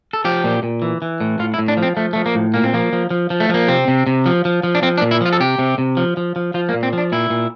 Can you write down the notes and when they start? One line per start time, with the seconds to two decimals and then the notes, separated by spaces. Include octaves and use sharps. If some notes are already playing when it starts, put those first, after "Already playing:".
0.13 A4
0.25 F3 G4
0.44 A#2
0.63 A#2
0.82 E3
1.02 E3
1.21 A2
1.39 A2 F4
1.54 E4
1.59 A2
1.68 D4
1.77 F3
1.83 C4
1.97 F3 A3
2.13 F3 A3
2.26 A#3
2.35 A2
2.54 A#2 A#3
2.64 C4
2.74 F3 A#3
2.93 F3
3.11 F3
3.30 F3
3.40 A3
3.49 F3 A#3
3.68 C3 C4
3.88 C3
4.07 C3
4.26 F3
4.45 F3
4.63 F3
4.75 D4
4.83 F3 C4
4.97 D4
5.02 A#2
5.11 E4
5.21 F3 F4
5.33 A4
5.40 C3 G4
5.59 C3
5.78 C3
5.97 F3
6.17 F3
6.36 F3
6.54 F3 F4
6.69 A#3
6.74 A#2
6.83 C4
6.93 F3 D4
7.12 A#2 E4
7.30 A#2